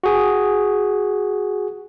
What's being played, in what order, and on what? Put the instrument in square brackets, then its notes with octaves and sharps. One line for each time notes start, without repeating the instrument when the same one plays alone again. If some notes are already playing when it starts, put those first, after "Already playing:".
[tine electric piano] F#4 G#4 G#5